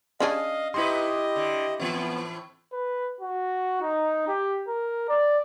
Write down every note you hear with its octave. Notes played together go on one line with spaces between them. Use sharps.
C#4 D4 G#4 D#5 F5
G#2 D#4 E4 G4 B4 D#5 C6
D3
A2 E3 B3 C4
B4
F#4
D#4
G4
A#4
D5